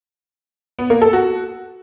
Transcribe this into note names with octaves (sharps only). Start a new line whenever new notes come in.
B3
A#3
A4
F#4